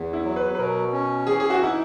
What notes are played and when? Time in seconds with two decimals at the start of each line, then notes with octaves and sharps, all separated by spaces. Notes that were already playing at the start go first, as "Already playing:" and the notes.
Already playing: E2
0.13 E4
0.24 F#3
0.36 B4
0.55 B4
0.58 B2 A#4
0.92 C#4
1.26 E3 G#4
1.40 G#4
1.50 F#4
1.61 D#4 E4